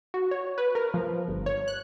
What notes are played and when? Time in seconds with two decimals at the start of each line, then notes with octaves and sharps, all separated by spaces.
0.14 F#4
0.31 C#5
0.58 B4
0.75 A#4
0.94 F3
1.28 G1
1.46 C#5
1.68 F#6